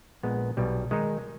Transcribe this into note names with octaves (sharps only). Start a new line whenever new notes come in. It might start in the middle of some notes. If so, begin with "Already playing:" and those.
A#1 A#2 G#3 B3
B1 B2 G3
D#3 G#3 D#4